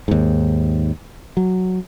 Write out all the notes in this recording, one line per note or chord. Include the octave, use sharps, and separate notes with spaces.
D#2 G#2
F#3